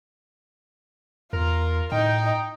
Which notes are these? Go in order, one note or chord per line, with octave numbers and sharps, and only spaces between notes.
E2 F4 A#4
A2 D#4 G5